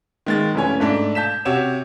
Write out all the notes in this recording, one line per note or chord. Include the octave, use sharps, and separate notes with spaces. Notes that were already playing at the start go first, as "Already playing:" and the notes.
D#3 G#3 A6
F1 E3 A3 C#4 C#5 G#5
G#2 A3 D4
A5 G6 B6 E7
C3 F#4 C#5 E7